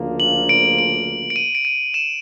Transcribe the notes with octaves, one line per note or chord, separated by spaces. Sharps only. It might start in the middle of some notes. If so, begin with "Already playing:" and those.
Already playing: D2 C#3 F3 A#3
F#7
D7
D7
D7
D#7
D7
D#7
E7